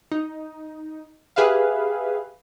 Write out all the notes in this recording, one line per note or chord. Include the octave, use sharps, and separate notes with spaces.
D#4
G4 G#4 B4 E5 F5